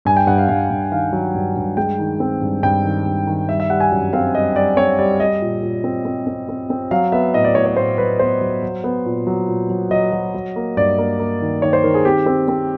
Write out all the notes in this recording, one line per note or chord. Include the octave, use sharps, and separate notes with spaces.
G2 G#5
G5
G2 F#5
F5
G2 F5
G2
D#3 F5
F#3
G2
G2
G#3 G5
D#3
C4
G2
G2 G5
D#3
G2
D#3
G3 E5
E5
G3 F#5
G#5
F#2
C4 F5
G3 D#5
G3 D5
C4 C#5
G3 D5
G3 D#5
A#2
A#2
C4
C4
C4
C4
C4
F#3 F5
B3 E5
A2 D#5
D5
A2 C#5
C#5
A2 C5
F#3 B4
B3 C5
F#3
F#3
B3
A#2
F#3
A#2
F#3
F#3 D#5
F#3
F#3
A#3
G2 D5
A#3
A#3
D#3
D#3 C#5
C5
D#3 A#4
G#4
C4 G4
C4
C4